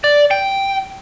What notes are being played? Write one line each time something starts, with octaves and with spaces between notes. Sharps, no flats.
D5
G5